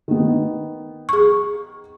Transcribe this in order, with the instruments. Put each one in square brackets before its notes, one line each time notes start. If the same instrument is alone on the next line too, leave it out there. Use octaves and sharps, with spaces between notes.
[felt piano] D#3 B3
[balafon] G#4 C#6